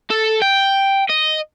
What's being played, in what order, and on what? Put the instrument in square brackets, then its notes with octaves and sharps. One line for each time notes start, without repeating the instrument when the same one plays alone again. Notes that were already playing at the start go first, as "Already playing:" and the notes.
[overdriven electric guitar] A4
G5
D#5